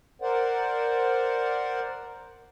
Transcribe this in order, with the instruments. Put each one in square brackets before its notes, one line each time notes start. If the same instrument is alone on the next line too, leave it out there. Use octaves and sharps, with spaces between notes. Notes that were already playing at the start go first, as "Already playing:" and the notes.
[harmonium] A#4 C5 D5 F#5